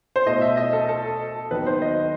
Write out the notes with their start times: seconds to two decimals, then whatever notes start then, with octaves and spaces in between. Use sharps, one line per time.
0.16 C5
0.26 B2 A3 E4 D#5
0.42 E5
0.57 D#5
0.73 A4
0.89 A4
1.51 D#2 D#3 F#3 B3 B4
1.67 C5
1.82 D#5